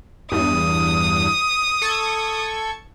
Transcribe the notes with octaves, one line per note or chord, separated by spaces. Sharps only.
E2 G2 D#6
A4 C#6 G#6